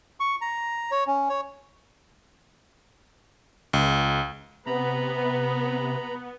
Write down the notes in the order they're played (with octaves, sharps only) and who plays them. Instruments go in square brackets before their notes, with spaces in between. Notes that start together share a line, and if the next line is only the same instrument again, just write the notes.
[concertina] C#6
A#5
C#5
C#4
C#5
[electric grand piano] C#2
[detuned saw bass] C3 [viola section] B3 [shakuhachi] B4 [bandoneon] A#5 B5